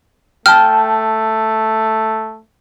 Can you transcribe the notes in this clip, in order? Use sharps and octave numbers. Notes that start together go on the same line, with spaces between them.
A3 G5 A5 F6